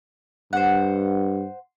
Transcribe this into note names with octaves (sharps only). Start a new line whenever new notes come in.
G2 C5 F#5